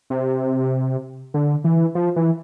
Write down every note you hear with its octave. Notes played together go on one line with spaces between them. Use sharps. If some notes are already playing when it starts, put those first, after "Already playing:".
C3
D3
E3
F3
E3